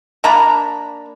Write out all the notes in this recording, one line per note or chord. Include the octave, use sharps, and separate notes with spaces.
A#3 D4 A#5 B5